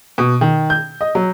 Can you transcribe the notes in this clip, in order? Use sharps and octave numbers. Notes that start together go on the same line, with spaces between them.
B2
D#3
G6
D#5
F#3